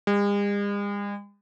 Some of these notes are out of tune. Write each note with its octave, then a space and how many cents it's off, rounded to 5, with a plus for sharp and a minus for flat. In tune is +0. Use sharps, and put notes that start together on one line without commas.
G#3 -45